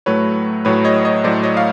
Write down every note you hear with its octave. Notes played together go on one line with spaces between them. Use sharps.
A2 F#3 A3 B4 C#5
A2 F#3 A3 B4 C#5
C#5 D#5
C#5 D#5
A2 F#3 A3 C5 D5
C#5 D#5
F5